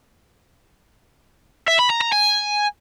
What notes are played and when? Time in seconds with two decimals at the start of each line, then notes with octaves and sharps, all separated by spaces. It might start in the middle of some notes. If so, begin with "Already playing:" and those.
1.68 E5
1.79 B5
1.90 A#5
2.01 A#5
2.12 G#5